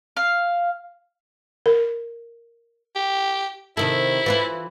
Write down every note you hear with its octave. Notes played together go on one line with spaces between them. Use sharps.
F5
A#4
G4
C3 D#3 E4 A4
E3 F4 B4